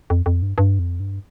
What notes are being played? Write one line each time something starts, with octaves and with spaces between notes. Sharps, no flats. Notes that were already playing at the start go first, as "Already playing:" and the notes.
F2
F2
G2
G2
F2
G2